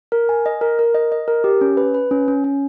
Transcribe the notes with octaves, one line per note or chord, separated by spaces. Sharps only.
A#4
G#5
D#5
A#4
A#4
D#5
D#5
A#4
G4
C#4
B4
B4
C#4
C#4
C#4